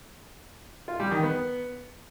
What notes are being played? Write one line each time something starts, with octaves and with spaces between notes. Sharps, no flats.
F4
G3
D#3
B3